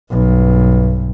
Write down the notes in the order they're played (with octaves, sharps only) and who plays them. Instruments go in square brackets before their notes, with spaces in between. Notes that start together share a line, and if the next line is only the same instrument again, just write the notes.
[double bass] B1 G2